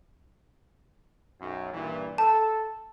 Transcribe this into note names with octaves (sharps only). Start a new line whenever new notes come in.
B1 F#2
G2 A#2 E3
A4 A5